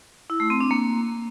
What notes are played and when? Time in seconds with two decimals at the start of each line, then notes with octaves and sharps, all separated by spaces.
0.30 E4
0.40 A3
0.50 C4
0.60 D4
0.71 A#3